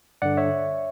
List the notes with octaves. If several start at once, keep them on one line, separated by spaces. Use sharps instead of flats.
G2 D3 D5 F#5
C#5 E5